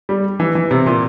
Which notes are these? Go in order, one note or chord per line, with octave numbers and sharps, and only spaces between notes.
G3
E3
E3
C3
A#2